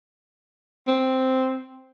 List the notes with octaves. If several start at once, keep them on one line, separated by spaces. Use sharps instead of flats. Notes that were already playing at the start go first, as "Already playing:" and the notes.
C4